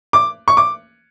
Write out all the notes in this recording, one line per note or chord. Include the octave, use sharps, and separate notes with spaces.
D6
C#6
D6